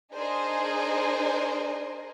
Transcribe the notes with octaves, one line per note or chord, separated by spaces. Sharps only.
D4 D#4 G#4 A#4 C5 D#5